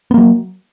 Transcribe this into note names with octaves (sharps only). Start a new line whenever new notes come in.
F#3 A#3 B3